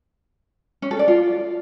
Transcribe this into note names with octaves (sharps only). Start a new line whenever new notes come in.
C#4
A4
D5
F4